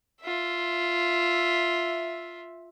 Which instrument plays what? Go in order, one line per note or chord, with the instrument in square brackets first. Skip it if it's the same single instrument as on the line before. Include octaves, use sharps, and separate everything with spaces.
[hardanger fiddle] F4 E5